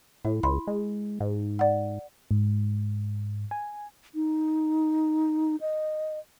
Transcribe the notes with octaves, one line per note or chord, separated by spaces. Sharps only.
A2 E4
C#2 B5 C6
G#3
G#2
D5 F#5
G#2
G#5
D#4
D#5